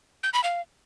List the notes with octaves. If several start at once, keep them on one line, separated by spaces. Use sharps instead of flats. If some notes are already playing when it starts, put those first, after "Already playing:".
G6
B5
F5